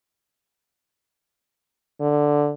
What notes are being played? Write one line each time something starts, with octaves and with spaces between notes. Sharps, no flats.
D3